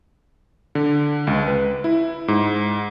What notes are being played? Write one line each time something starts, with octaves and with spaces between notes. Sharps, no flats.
D3
C#2
B4
E4
G#2